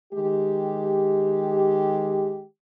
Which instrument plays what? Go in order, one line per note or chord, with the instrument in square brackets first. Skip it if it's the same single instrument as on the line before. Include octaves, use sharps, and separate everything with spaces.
[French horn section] D#3 G#3 G4